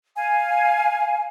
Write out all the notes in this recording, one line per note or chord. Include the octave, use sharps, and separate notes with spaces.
F5 G#5